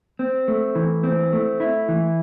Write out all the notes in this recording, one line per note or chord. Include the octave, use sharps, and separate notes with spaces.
C4
A3
E3
C4
A3
E4
E3